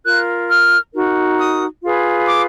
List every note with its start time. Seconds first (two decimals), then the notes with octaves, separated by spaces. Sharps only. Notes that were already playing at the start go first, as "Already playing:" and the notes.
0.05 F4 A#4 F#6
0.49 F6
0.93 D#4 F#4 A#4
1.39 D#6
1.83 F4 G#4 B4
2.27 D6